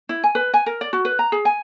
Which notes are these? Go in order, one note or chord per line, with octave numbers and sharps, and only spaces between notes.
E4
G#5
B4
G#5
A#4
D5
F#4
B4
A#5
G#4
G#5